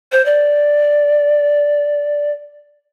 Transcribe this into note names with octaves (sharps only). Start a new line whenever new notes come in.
C5
D5